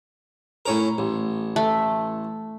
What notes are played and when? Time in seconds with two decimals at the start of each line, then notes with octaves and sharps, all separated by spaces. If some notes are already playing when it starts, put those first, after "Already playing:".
0.66 A2 C#4 A#4
0.98 A1
1.56 A3